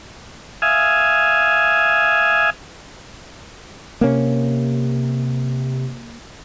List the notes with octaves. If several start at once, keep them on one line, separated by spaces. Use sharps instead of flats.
E5 F5 G#5 D#6
C3 A#3 C#4